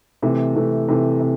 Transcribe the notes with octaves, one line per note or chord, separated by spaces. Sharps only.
C3 E3 A3
C3 E3 A3
C3 E3 A3
C3